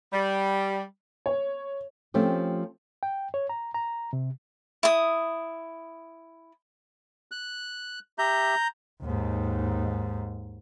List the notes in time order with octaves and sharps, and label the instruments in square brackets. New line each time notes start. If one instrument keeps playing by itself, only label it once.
[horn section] G3
[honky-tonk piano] C#5
[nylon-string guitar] F3 A3 C4 C#4 G4
[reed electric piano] G5
C#5
A#5
A#5
C3
[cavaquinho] E4 D#6
[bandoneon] F#6
[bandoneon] G4 E5 [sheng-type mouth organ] A#5 G6
[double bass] D#2 G#2